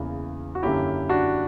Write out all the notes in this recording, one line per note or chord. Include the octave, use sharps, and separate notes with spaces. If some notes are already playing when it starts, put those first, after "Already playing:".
Already playing: E2 C#3 E3 A#3
F#4
F#2 D3 A#3 C#4 E4 G4
D4 F#4